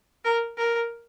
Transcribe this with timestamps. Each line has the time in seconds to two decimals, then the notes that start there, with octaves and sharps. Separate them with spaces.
0.25 A#4
0.58 A#4